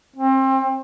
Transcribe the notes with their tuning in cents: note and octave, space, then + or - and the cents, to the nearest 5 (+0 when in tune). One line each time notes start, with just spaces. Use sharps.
C4 +30